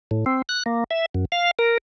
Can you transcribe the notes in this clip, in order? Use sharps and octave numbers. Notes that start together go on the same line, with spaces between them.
A2
C4
F#6
A#3
E5
F#2
F5
A#4